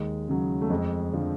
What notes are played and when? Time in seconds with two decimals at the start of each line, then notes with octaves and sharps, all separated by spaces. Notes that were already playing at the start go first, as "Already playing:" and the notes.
Already playing: D#2 G#3
0.28 C#3 F#3
0.62 A3
0.70 F2 G#3
1.13 D3 F3